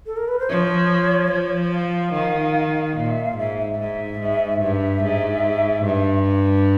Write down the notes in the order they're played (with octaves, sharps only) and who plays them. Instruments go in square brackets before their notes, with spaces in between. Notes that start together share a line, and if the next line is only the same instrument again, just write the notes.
[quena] A4
A#4
B4
C5
[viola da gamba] F3 [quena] C#5
[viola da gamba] F3
[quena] F5
[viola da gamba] D#3
[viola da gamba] A#2 [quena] F5
[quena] E5
F5
[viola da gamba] G#2 [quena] E5
[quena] E5
[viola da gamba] G#2 [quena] E5
[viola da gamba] G#2
[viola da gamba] G2 [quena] E5
[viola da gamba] G#2
G2